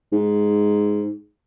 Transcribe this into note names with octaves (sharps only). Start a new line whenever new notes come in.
G#2